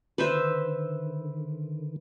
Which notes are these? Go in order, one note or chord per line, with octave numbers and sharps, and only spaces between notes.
D3 D#3 B4 C5 E5